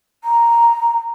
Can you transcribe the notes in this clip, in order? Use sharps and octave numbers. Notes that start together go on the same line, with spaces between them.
A#5